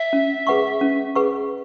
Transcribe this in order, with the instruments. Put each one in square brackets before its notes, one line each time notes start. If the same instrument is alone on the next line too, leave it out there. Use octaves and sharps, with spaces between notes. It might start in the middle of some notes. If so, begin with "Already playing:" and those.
Already playing: [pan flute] E5
[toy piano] C#4
G#4 B4 F#5 C#6
C#4
G#4 B4 F#5 C#6